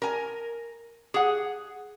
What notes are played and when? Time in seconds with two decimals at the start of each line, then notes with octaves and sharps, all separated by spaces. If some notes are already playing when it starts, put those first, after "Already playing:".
0.02 A#4 G#5
1.14 G#4 F#5